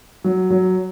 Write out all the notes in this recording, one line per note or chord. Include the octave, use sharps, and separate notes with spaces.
F#3
F#3